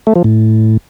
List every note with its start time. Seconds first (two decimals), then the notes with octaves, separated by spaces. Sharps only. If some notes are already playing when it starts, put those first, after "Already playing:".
0.07 A3
0.16 F3
0.24 A2